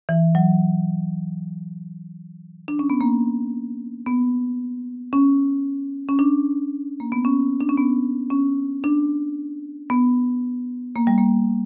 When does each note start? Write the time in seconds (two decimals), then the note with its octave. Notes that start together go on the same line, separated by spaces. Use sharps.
0.09 E3
0.35 F#3
2.68 D4
2.79 C#4
2.90 B3
3.01 A#3
4.06 B3
5.13 C#4
6.09 C#4
6.19 D4
7.00 A#3
7.12 B3
7.25 C#4
7.61 D4
7.69 C#4
7.78 B3
8.30 C#4
8.84 D4
9.90 B3
10.96 A#3
11.07 G3
11.18 A#3